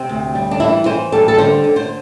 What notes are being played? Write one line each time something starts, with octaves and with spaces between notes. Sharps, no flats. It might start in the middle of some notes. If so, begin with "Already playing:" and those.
Already playing: C3 C4
D2
G3
D4
E3 E4
E3 C5
G3 A4
A4
D3 C5
D3
C5